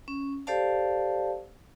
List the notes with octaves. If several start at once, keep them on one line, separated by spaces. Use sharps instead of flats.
C#4
G4 A4 C5 D5 F5 A5